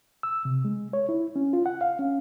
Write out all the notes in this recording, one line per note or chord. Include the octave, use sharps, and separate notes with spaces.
E6
C3
G#3
C#5
E4
C#4
F4
F#5
F5
C#4